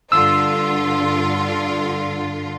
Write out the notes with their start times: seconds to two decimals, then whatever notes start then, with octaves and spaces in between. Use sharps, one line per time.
0.12 G2 D3 F4 E6